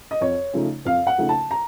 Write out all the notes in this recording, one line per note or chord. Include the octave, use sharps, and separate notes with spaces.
D#5
F2 C#5
C#3 F3 A3 D#4
F2 F5
F#5
C#3 F3 A3 D#4
A5
A#5